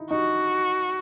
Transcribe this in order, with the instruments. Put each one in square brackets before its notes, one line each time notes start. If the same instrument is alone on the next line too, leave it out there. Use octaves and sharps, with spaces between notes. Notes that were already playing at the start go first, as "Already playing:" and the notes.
Already playing: [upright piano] D#4 E4
[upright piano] D#4 [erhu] F#4